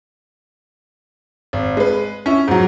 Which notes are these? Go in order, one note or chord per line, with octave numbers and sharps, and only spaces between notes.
G#1
G#3 B4
C#4 E4
G#2 F#3